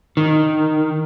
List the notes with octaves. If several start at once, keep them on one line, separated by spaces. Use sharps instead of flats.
D#3